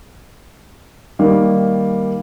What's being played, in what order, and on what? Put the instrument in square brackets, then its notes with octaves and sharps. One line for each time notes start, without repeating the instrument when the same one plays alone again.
[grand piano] D#3 G3 A#3